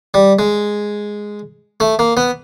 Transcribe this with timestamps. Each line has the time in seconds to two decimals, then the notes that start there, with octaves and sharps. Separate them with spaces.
0.14 G3
0.39 G#3
1.80 A3
1.99 A#3
2.17 B3